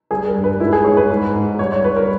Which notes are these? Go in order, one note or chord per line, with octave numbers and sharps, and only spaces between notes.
G3 G#4
A#4
G2
B4
G#2 E4
G#4
G#2 C#5
B4
G#2
G#2
G3 C#5
C#5
G3 B4
A#4